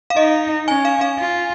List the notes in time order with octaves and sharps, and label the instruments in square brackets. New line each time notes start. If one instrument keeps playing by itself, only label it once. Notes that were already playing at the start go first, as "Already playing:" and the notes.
[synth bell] F5
[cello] D#4 [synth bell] D#5
[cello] C#4 [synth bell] G#5
[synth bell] F5
F5
[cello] F4